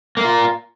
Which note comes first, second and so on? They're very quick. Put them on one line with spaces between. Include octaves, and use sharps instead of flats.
A#3 A#4 F4